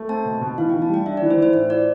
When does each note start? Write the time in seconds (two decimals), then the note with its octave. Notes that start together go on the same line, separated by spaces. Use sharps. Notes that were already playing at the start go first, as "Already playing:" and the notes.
Already playing: A3
0.09 C4 A5
0.25 B2
0.41 B2
0.58 E3 F5
0.69 G5
0.74 E3
0.82 A5
0.89 G3 G5
1.06 D4 E5
1.17 D5
1.22 E3
1.30 C5
1.37 E3
1.43 C5
1.53 A2 C5
1.70 F4 D5